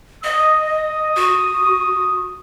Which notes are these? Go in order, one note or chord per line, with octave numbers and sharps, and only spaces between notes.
D#5 D#6
F#4